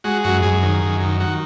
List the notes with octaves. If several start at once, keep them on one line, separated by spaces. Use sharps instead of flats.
G#3 F#4
F#2 F#4
F#2 G#4
D#3
F#2
D#3
D#3 F#4